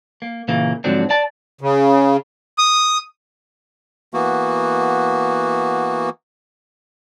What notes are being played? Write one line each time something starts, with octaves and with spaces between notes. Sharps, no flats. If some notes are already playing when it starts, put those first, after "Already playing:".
A#3
A#2 C#3 E3 A#3
G#2 D3 F3 F#3 C4 D4
D5 A5
C#3
D#6
E3 A#3 B3 F#4